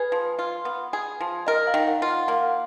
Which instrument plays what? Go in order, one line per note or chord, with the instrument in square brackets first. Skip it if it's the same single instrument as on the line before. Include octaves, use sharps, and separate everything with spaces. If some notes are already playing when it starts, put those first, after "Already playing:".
Already playing: [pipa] G#4 [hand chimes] B4
[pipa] F3
F4
B3
G#4
F3
[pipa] A#4 [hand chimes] D#5
[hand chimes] F5
[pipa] D#3
[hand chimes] F#5
[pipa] F4
[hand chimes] F#5
[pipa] A#3 [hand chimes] F5